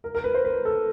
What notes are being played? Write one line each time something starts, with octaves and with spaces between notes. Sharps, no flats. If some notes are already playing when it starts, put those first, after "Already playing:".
A#4
A#4
B4
C5
B4
A4